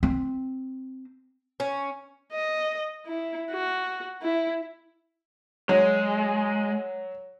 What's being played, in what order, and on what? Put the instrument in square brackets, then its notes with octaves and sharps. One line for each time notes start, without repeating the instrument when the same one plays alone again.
[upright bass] C4
[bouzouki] C#4
[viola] D#5
E4
F#4
E4
[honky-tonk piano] F#3 [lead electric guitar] G#3